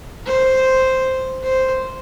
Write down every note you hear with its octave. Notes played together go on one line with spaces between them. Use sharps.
C5
C5